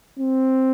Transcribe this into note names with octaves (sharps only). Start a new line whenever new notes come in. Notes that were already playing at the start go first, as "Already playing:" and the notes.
C4